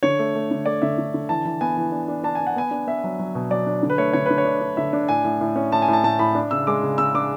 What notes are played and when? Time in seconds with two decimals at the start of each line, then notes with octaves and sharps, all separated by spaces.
0.03 D3 C#5
0.19 A3
0.35 A3
0.51 D3
0.66 A3 D5
0.82 D3 E5
0.98 D3
1.14 D3
1.29 E3 A5
1.45 E3
1.61 B3 G#5
1.77 E3
1.92 D4
2.08 D4
2.24 D4 A5
2.35 D4 G#5
2.47 F#5
2.56 B3 G#5
2.71 D4
2.87 B3 E5
3.04 F#3
3.19 F#3
3.35 B2
3.50 F#3 D5
3.67 D4
3.83 D3
3.90 B4
3.98 A3 C#5
4.13 D3 C#5
4.26 D3 B4
4.38 C#5
4.45 D4
4.61 D4
4.77 D3 E5
4.93 D4
5.09 A2 G#5
5.24 A2
5.41 A2
5.56 C#4
5.72 A2 A5
5.82 G#5
5.88 A2
5.93 A5
6.04 A2 A5
6.19 A2 B5
6.35 D4
6.51 C#3 E6
6.67 G#3 D6
6.83 C#3
6.98 C#3 E6
7.14 D4 D6